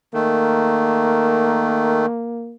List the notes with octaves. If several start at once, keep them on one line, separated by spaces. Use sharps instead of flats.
D#3 A3 A#3